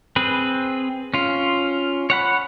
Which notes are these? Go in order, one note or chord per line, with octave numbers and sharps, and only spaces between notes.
C4 G#4 B4
C#4 F4
C#5 F#5 B5